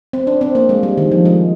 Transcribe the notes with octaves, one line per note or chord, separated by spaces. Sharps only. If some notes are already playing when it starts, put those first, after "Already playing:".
C4
D4
C4
A#3
G#3
G3
D#3
F3
G#3